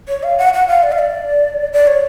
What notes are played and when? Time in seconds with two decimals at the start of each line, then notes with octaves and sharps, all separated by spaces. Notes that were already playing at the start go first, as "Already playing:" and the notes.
0.09 C#5
0.23 F5
0.38 F#5
0.54 F#5
0.68 F5
0.83 D5
0.92 F5
0.99 D5
1.73 D5
1.87 C#5